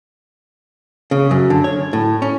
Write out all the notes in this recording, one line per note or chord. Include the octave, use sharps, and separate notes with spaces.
C#3
F#2
D3
C#5
A2
C#4